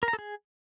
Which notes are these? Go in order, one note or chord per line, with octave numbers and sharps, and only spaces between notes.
A#4
A#5
A4
G#4